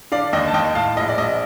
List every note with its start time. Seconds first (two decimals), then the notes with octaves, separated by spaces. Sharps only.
0.12 D3 D5 F5
0.33 D#2 D#5 G5
0.48 A5
0.54 D#2 D#5 G5
0.75 A2 F5 A5
0.97 A#1 D#5
1.08 D5
1.18 A#1 D#5